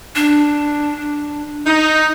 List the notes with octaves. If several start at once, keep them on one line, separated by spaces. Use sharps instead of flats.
D4
D#4